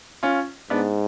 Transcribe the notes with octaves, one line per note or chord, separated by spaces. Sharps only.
C#4 F4
G#2 B3 D4